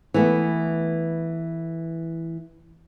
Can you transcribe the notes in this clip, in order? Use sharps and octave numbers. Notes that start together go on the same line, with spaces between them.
E3 A3 B3